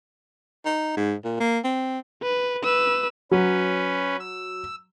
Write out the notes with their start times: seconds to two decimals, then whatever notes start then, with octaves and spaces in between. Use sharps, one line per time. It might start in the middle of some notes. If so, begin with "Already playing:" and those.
0.65 D#4
0.97 G#2
1.24 A#2
1.40 A#3
1.64 C4
2.22 B4
2.63 B4 E6
3.31 F#3 C#4 B4
4.20 E6